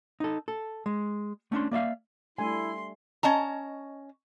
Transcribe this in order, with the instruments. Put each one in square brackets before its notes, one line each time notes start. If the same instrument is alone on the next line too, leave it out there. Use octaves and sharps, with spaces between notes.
[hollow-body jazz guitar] D#4 A4
A4
G#3
A3 C#4 D4 C6
A#3 D5 E5 F5
[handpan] G3 A3 D4 [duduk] E4 [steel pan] G#5 [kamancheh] C6
[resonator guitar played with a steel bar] C#4 D#5 A5 A#5